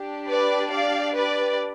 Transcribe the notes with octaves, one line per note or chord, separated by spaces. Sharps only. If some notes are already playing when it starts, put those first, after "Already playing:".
Already playing: D4 G4
B4 D5
D5 F5
B4 D5